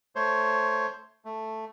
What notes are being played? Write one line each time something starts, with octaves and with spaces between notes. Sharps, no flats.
A3 C5 C#5
A3